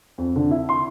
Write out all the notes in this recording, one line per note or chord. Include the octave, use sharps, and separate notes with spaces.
F2
D3
E4
C6